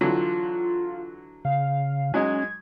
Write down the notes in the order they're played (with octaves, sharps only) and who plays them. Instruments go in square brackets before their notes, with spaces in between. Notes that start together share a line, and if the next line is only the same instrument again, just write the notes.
[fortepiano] D3 E3 F#3 [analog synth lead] F4
[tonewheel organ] C#3 [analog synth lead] F5
[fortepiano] F#3 G#3 D#4 [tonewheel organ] C#4 [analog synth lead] G#6